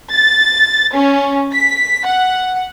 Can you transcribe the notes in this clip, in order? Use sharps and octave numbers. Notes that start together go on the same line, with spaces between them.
A6
C#4
B6
F#5